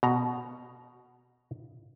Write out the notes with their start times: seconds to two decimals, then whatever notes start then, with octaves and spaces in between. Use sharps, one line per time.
0.03 B2 A#5